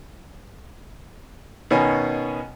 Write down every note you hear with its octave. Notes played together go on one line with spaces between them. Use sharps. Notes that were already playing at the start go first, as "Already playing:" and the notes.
B2 D#3 B3 C#4 G#5